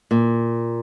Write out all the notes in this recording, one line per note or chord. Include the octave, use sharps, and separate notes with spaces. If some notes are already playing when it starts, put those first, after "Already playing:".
A#2